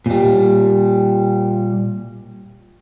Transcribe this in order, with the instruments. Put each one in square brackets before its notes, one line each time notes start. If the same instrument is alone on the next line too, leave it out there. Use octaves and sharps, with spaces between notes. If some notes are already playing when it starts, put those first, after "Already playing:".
[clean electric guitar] A#2 G3